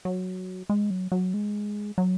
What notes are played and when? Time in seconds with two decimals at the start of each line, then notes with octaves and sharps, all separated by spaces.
0.05 F#3
0.70 G#3
0.91 F#3
1.12 F#3
1.34 G#3
1.98 F#3